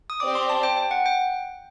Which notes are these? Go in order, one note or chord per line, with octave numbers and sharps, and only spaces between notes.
D#6
C4 G4 D5 D6
C6
A5
G5
G5
F#5
G5